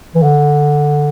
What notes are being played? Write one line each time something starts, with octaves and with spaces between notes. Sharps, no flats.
E3
D3